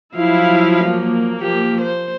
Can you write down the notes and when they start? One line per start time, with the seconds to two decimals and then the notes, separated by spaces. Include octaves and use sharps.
0.17 F3 F#3 E4 F5
0.88 A#3
1.40 F3 G4
1.82 C5